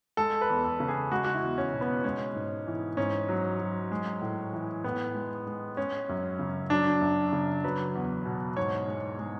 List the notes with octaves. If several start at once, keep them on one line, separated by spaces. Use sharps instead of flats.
G#3 A4
B4
E2
A4
C#3
G#4
G#3 F#4
F#4
E4
E2
C#4
B2
B3
G#3 C#4
G#2
E3
G#2 C#4
F#3
F#3
G#3
A2
E3
A2 B3
G#3
G#3
G#3 C#4
F#2
C#3
F#3 D4
F#2
C#3
F#3 B4
E2
B2
G#2 C#5
G#3
G#3